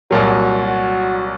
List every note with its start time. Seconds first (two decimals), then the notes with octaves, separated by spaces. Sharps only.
0.11 C2 A#2 F#3 F#4
0.67 F#4